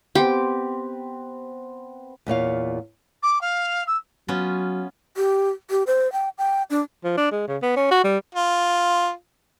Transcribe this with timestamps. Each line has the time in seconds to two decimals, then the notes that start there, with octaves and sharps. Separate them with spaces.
0.15 B3 C4 G4 B4
2.27 E2 A#2 C#5 F5
3.23 D6
3.41 F5
3.87 E6
4.28 F#3 B3 C#4 F4
5.17 G4
5.70 G4
5.87 C5
6.13 G5
6.38 G5
6.70 D4
7.04 F3
7.17 D4
7.32 G#3
7.48 C#3
7.62 B3
7.77 C#4
7.91 F#4
8.04 G3
8.35 F4